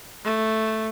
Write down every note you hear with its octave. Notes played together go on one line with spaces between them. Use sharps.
A3